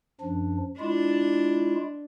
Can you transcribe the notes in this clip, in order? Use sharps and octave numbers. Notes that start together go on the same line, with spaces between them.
F#2 F3 D4
G#3 D4 E4 F4